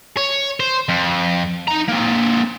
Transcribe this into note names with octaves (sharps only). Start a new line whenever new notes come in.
C#5
C5
F2
D#4 A#5
A#3 C4